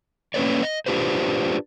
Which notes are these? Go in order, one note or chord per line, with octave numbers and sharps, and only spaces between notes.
A#3 C#4 A#4 B4 C#5 D5
D#5
D4 F4 G4 B4 C5